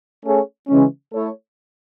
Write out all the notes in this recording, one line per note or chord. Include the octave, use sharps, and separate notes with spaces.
A3 C#4 G#4 C#5
C#3 E3 G#3 C#4
A3 E4 A4 C#5